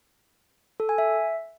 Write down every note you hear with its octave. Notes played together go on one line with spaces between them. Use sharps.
A4
G#5
E5